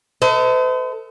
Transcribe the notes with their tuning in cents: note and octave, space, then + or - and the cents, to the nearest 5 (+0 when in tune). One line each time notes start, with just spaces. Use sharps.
A4 +30 C5 -45 D#5 +35